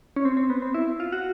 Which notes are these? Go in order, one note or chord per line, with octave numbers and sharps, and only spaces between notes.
C#4
C4
C4
B3
C4
E4
F4
F#4